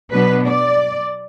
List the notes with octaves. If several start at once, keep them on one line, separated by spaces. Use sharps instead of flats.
B2 F#3 B3 D4 B4
D5